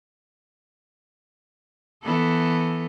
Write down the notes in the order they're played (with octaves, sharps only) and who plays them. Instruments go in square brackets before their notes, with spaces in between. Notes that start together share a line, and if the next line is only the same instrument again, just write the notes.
[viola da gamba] E3 B3 A4